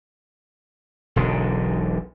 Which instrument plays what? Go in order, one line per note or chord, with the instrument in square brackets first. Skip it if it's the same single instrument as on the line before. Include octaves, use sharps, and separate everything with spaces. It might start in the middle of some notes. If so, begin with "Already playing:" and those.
[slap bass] E1 B1 B2 D3